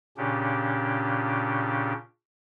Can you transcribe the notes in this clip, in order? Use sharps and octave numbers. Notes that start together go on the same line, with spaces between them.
A#2 C#3 C#4 D4 G4